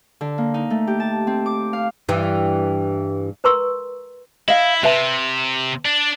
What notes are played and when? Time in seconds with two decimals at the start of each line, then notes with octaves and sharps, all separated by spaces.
0.21 D3
0.38 A#3
0.54 D#4
0.70 A3
0.87 G4
1.00 A5
1.27 C4
1.46 D6
1.73 F5
2.09 G2 E3
3.44 A#4 B4 A#5 C6 C#6 E6
4.48 E4 D#5 F5
4.83 C3 B4 E5 A5
5.85 D4